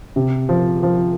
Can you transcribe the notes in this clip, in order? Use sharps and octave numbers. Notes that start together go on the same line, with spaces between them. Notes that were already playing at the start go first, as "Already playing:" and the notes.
C3
F3
F3